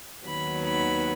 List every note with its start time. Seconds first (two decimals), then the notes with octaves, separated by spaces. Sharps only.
0.25 D#2 D#3 F#3 B3 B5
0.66 B5